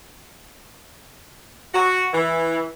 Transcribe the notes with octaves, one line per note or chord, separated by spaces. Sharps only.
F#4
E3